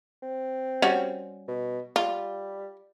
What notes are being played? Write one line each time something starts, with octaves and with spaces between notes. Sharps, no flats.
C4
G3 C#4 F#4
B2
G3 F4